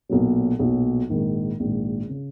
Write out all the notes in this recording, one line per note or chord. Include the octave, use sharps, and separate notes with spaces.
B1 A#2 F#3
B1 A#2 F#3
A#1 G#2 D#3
A#1 G#2 D#3
C#3